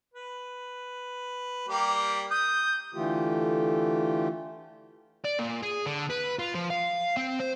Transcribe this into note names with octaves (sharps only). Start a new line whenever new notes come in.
B4
G3 A#3 G4
D#6 G6
D3 E3 A3 F4 G4
D5
A#2
G#4
D3
B4
F4
F3
F5
C4
C5